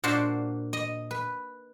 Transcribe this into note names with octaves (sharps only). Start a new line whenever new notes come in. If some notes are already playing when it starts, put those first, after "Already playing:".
A#2 D4 F#4 C5
D#5
B4